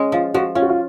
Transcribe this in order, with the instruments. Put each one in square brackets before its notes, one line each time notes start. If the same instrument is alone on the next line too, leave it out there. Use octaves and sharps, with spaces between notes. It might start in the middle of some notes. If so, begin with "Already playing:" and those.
Already playing: [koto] G#3 C#4
[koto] F3 [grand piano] F4
[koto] F3 [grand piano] F#4
[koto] C#4 [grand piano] F4
[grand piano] F#4
F4